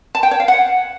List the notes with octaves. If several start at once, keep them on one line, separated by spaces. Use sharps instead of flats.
A5
G5
C#5
F5
F#5